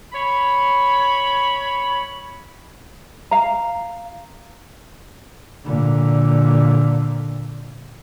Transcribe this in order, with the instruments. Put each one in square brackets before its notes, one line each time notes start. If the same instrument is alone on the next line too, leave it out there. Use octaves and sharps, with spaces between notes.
[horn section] C#5 B5
[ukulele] F5 A#5
[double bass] A#2 D3